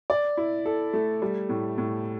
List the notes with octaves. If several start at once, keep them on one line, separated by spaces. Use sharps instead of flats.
D5
E4
A4
A3
G3
A2
A2